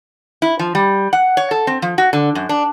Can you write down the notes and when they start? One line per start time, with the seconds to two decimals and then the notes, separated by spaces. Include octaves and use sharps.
0.42 E4
0.59 F3
0.75 G3
1.13 F#5
1.37 C#5
1.51 A4
1.67 C4
1.82 F3
1.98 F#4
2.13 D3
2.35 F#2
2.49 D4